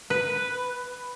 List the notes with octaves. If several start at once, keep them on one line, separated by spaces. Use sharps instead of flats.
B4